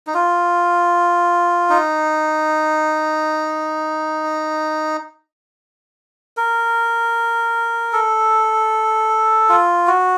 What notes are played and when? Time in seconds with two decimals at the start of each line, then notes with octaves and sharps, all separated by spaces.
0.07 D#4
0.14 F4
1.70 D#4
6.37 A#4
7.93 A4
9.49 F4
9.87 F#4